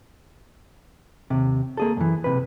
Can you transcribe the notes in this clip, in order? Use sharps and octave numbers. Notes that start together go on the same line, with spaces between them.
D#2 C3
A#3 G#4 A4
F#2 E3
B1 C3 B4